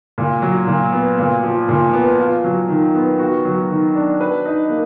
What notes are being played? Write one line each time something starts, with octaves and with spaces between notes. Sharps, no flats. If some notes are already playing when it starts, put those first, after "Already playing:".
A#2
F#3
A#2
B3
A#2
F3
A#2
B3
F4
F#3
D#3
B3
F#4
F#3
D#3
D4
B4
D#4
A#3